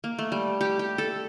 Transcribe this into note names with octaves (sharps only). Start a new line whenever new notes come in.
A#3
A3
G3
G4
G4
A4